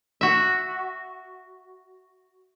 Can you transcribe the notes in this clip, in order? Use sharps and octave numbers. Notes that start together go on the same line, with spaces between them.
F#4 E5